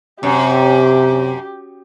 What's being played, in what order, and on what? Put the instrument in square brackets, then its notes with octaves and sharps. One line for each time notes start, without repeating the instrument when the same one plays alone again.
[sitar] F#2 [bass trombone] C3 [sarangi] G4